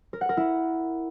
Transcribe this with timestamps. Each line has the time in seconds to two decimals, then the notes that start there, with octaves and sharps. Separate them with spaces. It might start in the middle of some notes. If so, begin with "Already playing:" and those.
0.13 A#4
0.21 F#5
0.29 A#4
0.37 E4